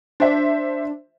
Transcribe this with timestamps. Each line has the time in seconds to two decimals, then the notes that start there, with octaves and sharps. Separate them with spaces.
0.20 D4 C5 E5